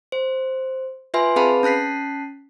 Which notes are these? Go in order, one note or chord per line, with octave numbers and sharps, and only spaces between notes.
C5
F4 B4 E5 G#5 C6
C4 G#4 B4 F5 A5 B5
C#4 A5 F#6 B6 C7